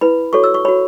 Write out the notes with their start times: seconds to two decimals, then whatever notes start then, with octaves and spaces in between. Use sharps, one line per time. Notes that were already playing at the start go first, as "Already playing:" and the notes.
0.01 E4 B4 B5
0.33 F#4 A4 C#5 C#6
0.44 E6
0.54 C#6
0.65 F#4 C#5 B5